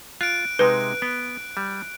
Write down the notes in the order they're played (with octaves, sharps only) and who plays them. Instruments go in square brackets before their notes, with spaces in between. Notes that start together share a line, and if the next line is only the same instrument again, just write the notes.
[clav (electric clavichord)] F4 [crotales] F#6 D7
[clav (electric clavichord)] C3 G#3 D#4 [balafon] B4
[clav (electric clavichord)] B3
G3